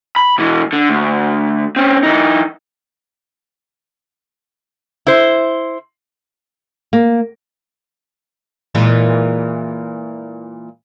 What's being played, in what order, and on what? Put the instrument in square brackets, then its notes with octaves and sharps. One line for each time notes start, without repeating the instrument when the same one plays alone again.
[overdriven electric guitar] B5
B2 E3
D3
D2
C4 C#4
E3 D#4
[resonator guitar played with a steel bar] E4 C5
[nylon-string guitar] A#3
[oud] A#2 E3 G#3